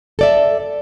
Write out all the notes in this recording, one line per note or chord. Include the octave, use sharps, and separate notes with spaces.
A4 D5 E5